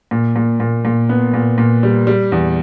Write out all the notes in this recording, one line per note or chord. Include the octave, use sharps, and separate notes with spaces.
A#2
A#2
A#2
A#2
B3
A#2
A#2
G3
G3
E2